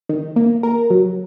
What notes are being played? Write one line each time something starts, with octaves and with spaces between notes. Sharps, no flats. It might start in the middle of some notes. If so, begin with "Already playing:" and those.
D#3
A#3
A#4
F#3